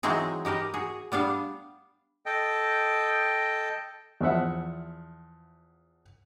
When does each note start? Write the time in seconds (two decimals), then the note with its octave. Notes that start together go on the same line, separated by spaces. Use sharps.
0.03 E3 F#3 G#3 C4 D#4 G#4
0.45 D#4 G4 A#4 B4
0.74 F#4 G#4
1.12 G3 B3 D4 F5
2.26 A4 D#5 G5
4.21 E2 F3 E5 F#5